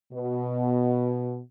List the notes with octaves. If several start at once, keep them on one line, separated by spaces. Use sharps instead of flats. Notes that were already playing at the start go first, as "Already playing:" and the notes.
B2